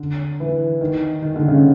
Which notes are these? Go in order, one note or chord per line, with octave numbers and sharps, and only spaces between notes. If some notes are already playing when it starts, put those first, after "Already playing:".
Already playing: D3
E3
D#3
D#3
D3
C#3